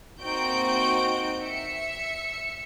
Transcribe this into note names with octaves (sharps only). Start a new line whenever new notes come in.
A#3 C4 D#4 F#4 G6 D7
E5 C#7